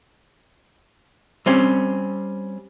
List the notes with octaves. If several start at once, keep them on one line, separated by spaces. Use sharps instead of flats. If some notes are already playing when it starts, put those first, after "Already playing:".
G3 C4 C#4